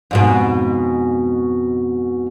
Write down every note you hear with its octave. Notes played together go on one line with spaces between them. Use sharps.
F2 G#2 B2